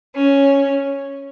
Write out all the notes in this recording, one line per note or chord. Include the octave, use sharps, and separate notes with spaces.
C#4